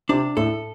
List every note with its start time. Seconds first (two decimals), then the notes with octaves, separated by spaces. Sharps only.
0.09 C3 D4
0.37 A2 A4